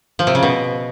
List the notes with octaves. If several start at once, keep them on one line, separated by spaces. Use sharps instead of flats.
F3
C3
C#3
B2